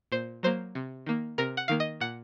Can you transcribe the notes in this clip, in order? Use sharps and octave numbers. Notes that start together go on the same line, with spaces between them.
A#2 C5
F#3 A#3 C5
C3
D#3 A#3
C3 A#4
F#5
D#3 A#3 F5
D#5
A#2 F#5